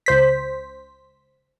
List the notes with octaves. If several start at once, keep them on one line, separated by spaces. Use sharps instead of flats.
C#2 C5 B6